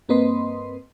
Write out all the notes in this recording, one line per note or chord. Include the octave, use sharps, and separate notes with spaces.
G2 A#3 C4 B4 D#5 C6